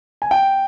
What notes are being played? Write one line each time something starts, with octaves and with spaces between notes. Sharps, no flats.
G#5
G5